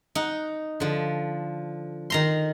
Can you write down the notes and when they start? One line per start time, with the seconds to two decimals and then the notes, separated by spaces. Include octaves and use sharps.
0.15 D#4 F#5
0.80 D3 F3
2.10 D#3 A#5 C6